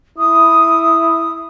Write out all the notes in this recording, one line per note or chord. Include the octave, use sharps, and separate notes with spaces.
E4 D#6